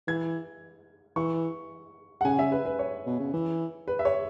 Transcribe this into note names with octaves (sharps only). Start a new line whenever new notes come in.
E3 G#6
E3 C#6
F#5
C#3 G#5
E5
B4
B4
C#5
B2
C#3
E3
B4
E5
C#5